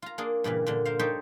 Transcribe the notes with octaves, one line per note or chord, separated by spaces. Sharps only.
F4 A#5
A#3 D4 G#4
G2 A#2 C#3 E3
A#2 D3
A#4 C5 F5
D#4 G4 A4 C5 C#5